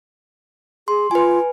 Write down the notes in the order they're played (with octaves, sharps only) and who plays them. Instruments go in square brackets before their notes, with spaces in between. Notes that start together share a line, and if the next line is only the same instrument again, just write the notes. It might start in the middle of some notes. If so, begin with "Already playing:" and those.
[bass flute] G#4 [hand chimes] C6
[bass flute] F4 [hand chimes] B4 G#5